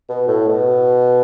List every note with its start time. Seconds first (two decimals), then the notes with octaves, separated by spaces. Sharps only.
0.09 B2
0.28 A2
0.48 B2